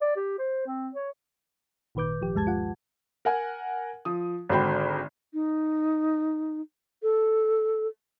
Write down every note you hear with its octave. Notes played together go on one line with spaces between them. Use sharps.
D5
G4
C5
C4
C#5
G#1 A#2 D#3 B4 D6 G6
G#1 F3 G4
D2 G2 G#3 A5 G#6
F4 F#5
A#4 F#5 G#5
F3 D#6
G#1 D3 F#4 C5 G5 B5
D#4
A4